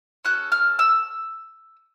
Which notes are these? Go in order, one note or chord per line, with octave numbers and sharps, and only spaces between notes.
C#4 F#4 A4 F#6
F6
E6